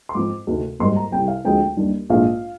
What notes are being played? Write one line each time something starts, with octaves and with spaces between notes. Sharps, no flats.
C6
G#2 F3 C4 D6
D2 C3 D#3
G#1 G#2 G3 A#3 C6
A#5
C2 C3 G3 G5
F5
D2 D3 F3 G#3 C4 G5
D#2 D#3 G3 D4
A#1 G#2 D#3 G#3 D4 F5